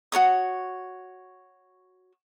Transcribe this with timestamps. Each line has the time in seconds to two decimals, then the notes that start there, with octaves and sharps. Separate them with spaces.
0.12 F#4 A#4 C#5 D#6